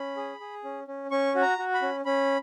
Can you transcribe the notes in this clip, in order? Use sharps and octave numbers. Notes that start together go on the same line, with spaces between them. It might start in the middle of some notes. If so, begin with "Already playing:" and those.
Already playing: C#4 B5
G#4
G#4
C#4
C#4
C#4 C#6
F#4
A#5
F#4
B5
C#4
C#4 B5